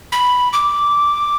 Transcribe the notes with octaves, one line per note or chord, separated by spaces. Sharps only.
B5
D6